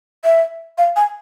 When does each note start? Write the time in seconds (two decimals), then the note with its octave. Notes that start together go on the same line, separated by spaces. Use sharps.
0.24 E5
0.78 F5
0.96 G#5